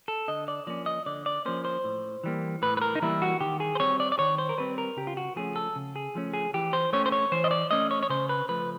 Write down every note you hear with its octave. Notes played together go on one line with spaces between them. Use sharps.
A4
D3 D#5
D5
F3 A#3 C#4 D5
D#5
D3 D5
D5
F3 A#3 C#4 C5
C5
A2
E3 G3 A#3
A2 B4
B4
A#4
D#4
E3 G3 A#3 E4
F#4
D#3 G4
G#4
C5
G3 C4 C#5
D5
D5
D#3 C#5
C5
A#4
G3 C4 B4
A#4
C#3 G4
F4
F#4
F3 A3 C#4 G#4
A4
C#3
G#4
F3 A3 C#4
G#4
E3 G4
C5
A3 C#4 C#5
C5
C#5
E3 C5
D#5
D5
A3 C#4 D#5
C#5
C#5
C#3 C5
B4
F3 A3 B4